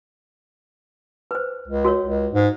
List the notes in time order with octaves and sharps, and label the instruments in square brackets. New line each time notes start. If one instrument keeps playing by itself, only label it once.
[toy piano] B4 C5
[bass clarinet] C#2
[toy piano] F#4 A#4 C#5
[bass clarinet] C#2
G#2